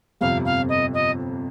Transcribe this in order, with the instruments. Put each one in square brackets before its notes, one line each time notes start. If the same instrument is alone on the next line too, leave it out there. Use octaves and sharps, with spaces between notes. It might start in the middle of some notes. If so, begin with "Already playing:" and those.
[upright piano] G1 F2 C3 [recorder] F5
[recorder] F5
D#5
D#5